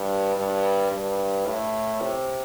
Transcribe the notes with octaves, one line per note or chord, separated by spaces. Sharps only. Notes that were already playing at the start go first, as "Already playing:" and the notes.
Already playing: G2
G2
G2
A2
C3